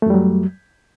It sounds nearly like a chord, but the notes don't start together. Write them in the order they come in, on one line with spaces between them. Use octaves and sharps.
A3 F#2 G3 F#3